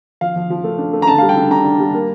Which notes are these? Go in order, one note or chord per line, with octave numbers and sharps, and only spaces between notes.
F3 F5
F3
F3
A3
D4
A3
A#5
D3 A5
G3 F5
G5
D3
D4 A#5
D4
G3
A#3